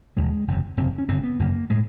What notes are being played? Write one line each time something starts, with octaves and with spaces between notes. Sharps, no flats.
E1 D#2 D3 G#3
F#1 E2 C3
F#1 E2 C3 C4
C#4
G1 F#2 C#3 C4
B3
G1 F#2 C#3 A#3
A2 G#3